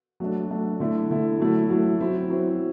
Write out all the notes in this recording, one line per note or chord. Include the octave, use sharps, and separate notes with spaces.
F#3 A3 D4
F#3 A3 D4
D3 A3 E4
D3 A3 E4
F#3 A3 E4
F#3 A3 E4
F#3 C4 E4
F#3 C4 E4